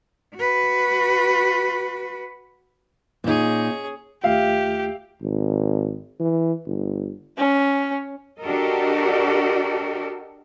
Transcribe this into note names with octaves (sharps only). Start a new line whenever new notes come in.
F#4 B4
A#2 C#4 D#4 G#4
D#2 A3 F4 G4 E5 F5
G#1
E3
G1
C#4
D4 F#4 G4 A4 A#4 D#5